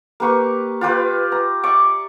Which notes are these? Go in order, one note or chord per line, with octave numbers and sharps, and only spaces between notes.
A#3 G4 B4 C#6
F4 G4 B4 F5
A#5
D5 E5 C#6 D6